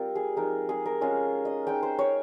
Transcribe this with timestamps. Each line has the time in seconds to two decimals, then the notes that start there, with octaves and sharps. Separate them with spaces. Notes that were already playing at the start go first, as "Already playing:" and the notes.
Already playing: G3 C4 F4 A#4
0.15 G#4
0.36 F3 G#3 D#4 A#4
0.69 G#4
0.86 A#4
1.01 G#3 C#4 F4 G#4
1.45 D#5
1.67 G#3 D#4 G5
1.83 C5
1.99 C#5